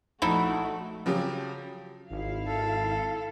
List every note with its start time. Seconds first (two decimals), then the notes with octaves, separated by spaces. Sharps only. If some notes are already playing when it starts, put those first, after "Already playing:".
0.22 A#1 A3 D#4 E4 F#4
1.06 C#3 F3 F#3 G4
2.10 G#1 E4 F5
2.47 A4